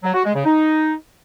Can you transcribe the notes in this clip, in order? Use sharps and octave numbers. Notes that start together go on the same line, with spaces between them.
F#3
F#4
G#3
C#3
D#4